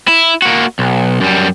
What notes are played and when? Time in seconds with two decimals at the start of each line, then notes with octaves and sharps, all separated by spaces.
0.08 E4
0.42 A#3 F#4
0.79 B1
1.21 F#2 G3